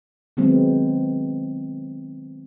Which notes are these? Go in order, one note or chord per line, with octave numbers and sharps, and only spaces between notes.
D#3 F#3 G#3 B3 C4